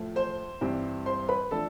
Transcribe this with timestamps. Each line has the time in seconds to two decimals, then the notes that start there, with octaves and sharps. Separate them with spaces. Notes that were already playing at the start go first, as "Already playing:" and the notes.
Already playing: A2 F3 A3
0.16 C5 C6
0.61 G2 E3 G3 C4
1.06 C5 C6
1.29 B4 B5
1.51 F3 A3 D4 A4 A5